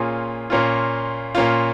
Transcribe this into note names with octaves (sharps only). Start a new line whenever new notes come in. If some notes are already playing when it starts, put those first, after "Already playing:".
Already playing: A#2 A#3 C#4 F4 G#4
A#2 A#3 C#4 F4
A#2 A#3 C#4 F4 F5